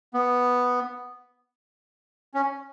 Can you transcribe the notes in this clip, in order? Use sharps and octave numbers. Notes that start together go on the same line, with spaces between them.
B3
C#4